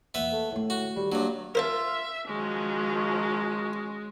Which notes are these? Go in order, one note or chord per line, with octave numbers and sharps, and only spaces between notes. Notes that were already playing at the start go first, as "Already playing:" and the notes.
E2 A#3 B3 E5
A3
A2 D3 A3
F#4
D#3 G3
G2 F#3 A#3 D4
F4 A#4 C5 E5 A5
D#3 F3 F#3 G#3 C#4